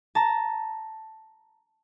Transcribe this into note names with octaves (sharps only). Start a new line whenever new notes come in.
A5 A#5